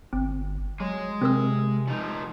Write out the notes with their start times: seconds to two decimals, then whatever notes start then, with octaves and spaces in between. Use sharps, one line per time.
0.13 G1 C4
0.80 F#3 G#3
1.21 C3 C4 A#4 E6
1.88 F3 D#4